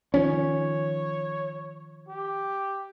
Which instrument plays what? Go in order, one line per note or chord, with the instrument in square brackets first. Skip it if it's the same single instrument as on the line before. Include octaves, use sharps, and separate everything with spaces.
[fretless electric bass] D#3 F3 C#4 [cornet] C#5
[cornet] G4